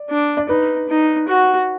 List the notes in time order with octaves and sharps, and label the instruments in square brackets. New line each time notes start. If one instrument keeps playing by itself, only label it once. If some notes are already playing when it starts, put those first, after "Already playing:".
Already playing: [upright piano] D5
[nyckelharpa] D4
[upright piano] D5
[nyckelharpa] D#4 [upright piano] B4
[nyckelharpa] D#4
F#4